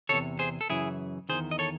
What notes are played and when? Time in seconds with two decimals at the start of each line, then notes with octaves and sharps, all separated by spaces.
0.09 D#3 A4 C#5
0.12 E2 C3
0.39 G#4 C5
0.61 A4
0.70 F#2 C#3 E3 E4 G#4
1.29 E2 C3 D#3 G#4 C5
1.51 D#5
1.59 A4 C#5